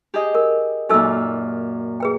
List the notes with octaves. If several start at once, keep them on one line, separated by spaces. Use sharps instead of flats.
G4 G#4 D#5
A#4
F#2 A#2 D#4 A4 E6
G#4 B4 G5